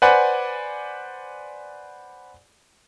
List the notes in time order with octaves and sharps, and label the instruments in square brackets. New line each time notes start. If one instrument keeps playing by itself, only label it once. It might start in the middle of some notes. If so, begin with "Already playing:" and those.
[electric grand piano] B4 C5 D5 F#5 G#5 B5